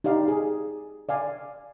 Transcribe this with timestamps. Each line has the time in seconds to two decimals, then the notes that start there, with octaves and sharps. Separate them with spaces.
0.04 D#4 G4 D5 F5
0.28 G#4
1.09 D5 F5 G#5